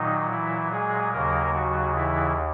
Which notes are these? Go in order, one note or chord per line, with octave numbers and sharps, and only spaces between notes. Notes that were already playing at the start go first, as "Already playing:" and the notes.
Already playing: A#2 D#3 F#3 D#4
E3 E4
G#3 G#4
D#2 C#3 F#3 A#3 A#4
F#3 F#4
E3 E4